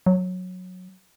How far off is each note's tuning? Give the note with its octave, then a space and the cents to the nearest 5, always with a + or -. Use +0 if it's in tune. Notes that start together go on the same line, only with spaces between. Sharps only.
F#3 -15